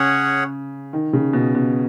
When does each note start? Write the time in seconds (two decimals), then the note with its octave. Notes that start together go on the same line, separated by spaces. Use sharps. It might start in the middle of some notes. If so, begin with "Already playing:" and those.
Already playing: C#3 C#4 G#4 C#5 F#5
0.93 D#3
1.13 C#3
1.33 B2
1.55 B2